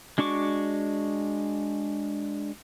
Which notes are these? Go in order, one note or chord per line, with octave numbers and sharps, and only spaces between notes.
G#3 D4 F#4 C#6 D6